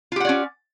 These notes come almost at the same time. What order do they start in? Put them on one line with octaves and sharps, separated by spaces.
F4 G4 F#5 D5 C#4